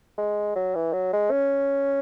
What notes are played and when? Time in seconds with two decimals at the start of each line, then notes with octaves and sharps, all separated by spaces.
0.18 G#3
0.56 F#3
0.75 E3
0.93 F#3
1.13 G#3
1.31 C#4